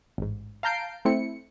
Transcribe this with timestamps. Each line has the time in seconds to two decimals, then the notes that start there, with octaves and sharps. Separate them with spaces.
0.18 A1 G#2
0.63 F5 A5 A#5 G6 C7 D7
1.05 A3 C4 E4 C#7